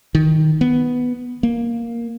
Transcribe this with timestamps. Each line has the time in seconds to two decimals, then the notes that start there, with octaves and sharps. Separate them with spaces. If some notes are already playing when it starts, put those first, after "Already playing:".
0.15 D#3
0.61 B3
1.43 A#3